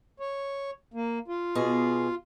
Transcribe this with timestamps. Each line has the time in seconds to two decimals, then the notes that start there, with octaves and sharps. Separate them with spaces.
0.20 C#5
0.94 A#3
1.28 F4
1.55 B2 G#4